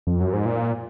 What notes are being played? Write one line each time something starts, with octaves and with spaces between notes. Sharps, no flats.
F2
F#2
G#2
A#2